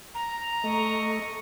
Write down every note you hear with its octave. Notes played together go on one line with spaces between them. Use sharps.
A#5
A3 D#5 C#6